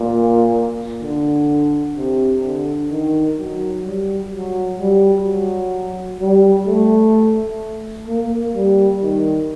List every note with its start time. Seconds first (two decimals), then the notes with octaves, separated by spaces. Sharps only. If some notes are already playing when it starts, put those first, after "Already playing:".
Already playing: A#2
1.03 D3
1.97 C3
2.43 D3
2.91 D#3
3.38 F#3
3.85 G3
4.32 F#3
4.79 G3
5.25 F#3
6.20 G3
6.66 A3
8.07 A#3
8.54 G3
9.03 D#3